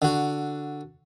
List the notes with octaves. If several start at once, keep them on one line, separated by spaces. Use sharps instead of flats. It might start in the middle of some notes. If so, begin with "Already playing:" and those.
D3 F#4